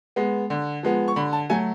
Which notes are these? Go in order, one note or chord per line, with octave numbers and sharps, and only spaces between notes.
G#3 B3
D3
F3 G#3 B3
C#6
D3 B5
A5
F#3 A3 G#5